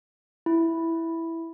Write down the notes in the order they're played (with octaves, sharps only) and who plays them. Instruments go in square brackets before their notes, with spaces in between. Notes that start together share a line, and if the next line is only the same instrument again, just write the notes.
[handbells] E4